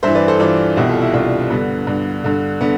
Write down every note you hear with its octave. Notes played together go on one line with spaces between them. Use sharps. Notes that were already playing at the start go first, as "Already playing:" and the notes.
G2 E3 C5 E5
B4 D5
A4 C5
G2 E3 D4 F4
C2 B2 E4 G4
F4 A4
E4 G4
C2 B2 D4 F4
G2 D3 B3
G2 D3
G2 D3
D3 B3